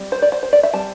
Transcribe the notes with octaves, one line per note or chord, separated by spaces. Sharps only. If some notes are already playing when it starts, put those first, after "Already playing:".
Already playing: G3 C4
C5
D5
C5
C5
D5
E5
G3 C4 A5